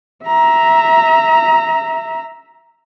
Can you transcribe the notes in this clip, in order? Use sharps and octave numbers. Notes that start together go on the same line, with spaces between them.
E5 A#5